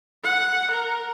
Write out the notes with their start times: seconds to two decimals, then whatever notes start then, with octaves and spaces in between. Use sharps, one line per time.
0.24 F#5
0.70 A#4